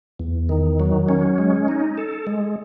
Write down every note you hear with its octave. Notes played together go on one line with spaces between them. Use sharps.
E2
D#3
F#3
C#4
G#3
D#4
A4
G#3